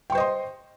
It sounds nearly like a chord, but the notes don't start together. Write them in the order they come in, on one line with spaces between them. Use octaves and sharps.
G5 C#6 C5 D#5 C6